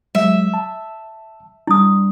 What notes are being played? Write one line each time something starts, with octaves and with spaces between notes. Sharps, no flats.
F#3 G#3 E5
A5
G3 D4 E4 D#6